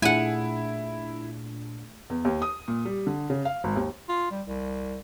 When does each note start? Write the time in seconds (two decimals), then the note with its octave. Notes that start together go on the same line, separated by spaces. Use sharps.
0.02 A#2 A3 D4 E4 G#4 F#5 G#5
2.10 E2
2.25 D#2
2.42 D#6
2.68 A#2
2.85 G3
3.07 D3
3.30 C#3
3.45 F5
3.64 G#1
3.76 D#2
4.09 F4
4.31 G3
4.47 C2